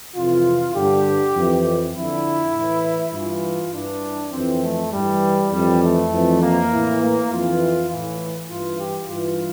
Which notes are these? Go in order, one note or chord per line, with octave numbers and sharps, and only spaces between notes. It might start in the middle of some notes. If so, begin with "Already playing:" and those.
F2 C3 E3 F4
G2 D3 G4
F2 E3
F2 D3 E4
A2 E3
G2 E3 F4
G2 E3 D4
F2 E3 C4
A3
G2 E3 G3
F2 E3 G3
A3
F2 E3
A#3
A2 E3
A#3
F2 E3 F4
A2 E3
G2 E3 F4
G4
G2 E3 F4